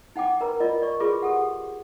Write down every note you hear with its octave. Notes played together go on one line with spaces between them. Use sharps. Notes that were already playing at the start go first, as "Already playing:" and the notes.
D#4 F#5 G5 D6
A#4 B4 A#5
F4 A#4 D5 D#5
D5 C#6
F4 G#4 B4 C6 D6
G4 A4 F#5